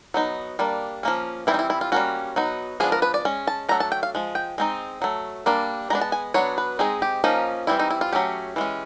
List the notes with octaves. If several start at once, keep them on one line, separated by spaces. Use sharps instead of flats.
F#3 B3 D#4
G3 A#3 D4
F3 A#3 C#4
E3 G3 C4 E4
D#4
E4
E4
F4
G3 A#3 C#4 F#4
F#3 B3 D#4
F3 G#3 B3 D4 G#4
A#4
B4
D5
G#3 C#4
A5
F#3 A3 D4 A#5
A5
G5
F5
F3 G#3
G5
G#3 C4 D#4
F#3 A3
G3 A#3 D4
G#3 B3 D4 A#5
A5
G#5
F#3 B3 D4 C#5
B4
G#3 C4 D#4 G#4
G4
F3 A#3 C#4 D#4
E3 G3 C4 E4
D#4
E4
F4
F#3 A3 C#4 G4
E3 G#3 C#4